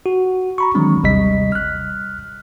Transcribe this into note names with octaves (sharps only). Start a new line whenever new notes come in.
F#4
A#5 B5 C#6
D#3 E3 F#3 G#3 C4 D4
A1 D#2 C3 G3 D#5 B6
F6 F#6